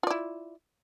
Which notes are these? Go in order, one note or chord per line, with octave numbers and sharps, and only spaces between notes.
E4 F4 D5